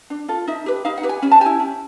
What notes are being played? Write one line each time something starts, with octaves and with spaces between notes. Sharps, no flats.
D4
F4 A4
D#4 E5
G4 B4
D#4 F5
F#5
G4 B4
G#5
C#4 G#5
A5
E4 G4 G#5
C#4